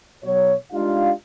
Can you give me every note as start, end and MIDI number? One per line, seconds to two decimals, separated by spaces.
0.23 0.53 35
0.23 0.53 54
0.23 0.53 73
0.72 1.10 56
0.72 1.10 62
0.72 1.10 63
0.72 1.10 65
0.72 1.10 67
0.72 1.10 77